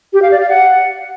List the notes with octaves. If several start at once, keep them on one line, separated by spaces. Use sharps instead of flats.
G4
F5
D5
F5
F#5